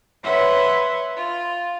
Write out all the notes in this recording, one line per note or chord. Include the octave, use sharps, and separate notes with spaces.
B4 C#5 E5 F#5 C6
F4